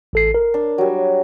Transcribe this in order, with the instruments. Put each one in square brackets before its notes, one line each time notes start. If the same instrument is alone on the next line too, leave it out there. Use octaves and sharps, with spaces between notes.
[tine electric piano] A1 A4 C7
A#4
[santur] D4
F#3 G3